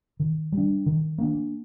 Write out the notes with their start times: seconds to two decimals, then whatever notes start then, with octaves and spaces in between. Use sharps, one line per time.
0.20 D#3
0.52 G3 D4
0.86 D#3
1.18 A#3 D4